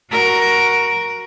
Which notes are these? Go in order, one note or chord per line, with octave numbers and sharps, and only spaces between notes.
F#4 A#4